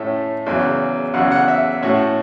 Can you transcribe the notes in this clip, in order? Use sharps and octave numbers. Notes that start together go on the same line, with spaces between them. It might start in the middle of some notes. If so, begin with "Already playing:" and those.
Already playing: A2 A3 C#4 E5
E2 C#3 F#3
E2 C#3 F#3 F#5
F#5
E5
A2 A3 C#4 F#4